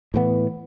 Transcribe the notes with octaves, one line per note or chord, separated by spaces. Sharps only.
A2 E3 B3